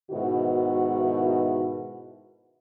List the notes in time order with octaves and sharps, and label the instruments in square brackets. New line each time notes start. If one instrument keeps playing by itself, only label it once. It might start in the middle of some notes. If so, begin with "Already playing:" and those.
[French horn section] G#2 B2 D#3 E4 F#4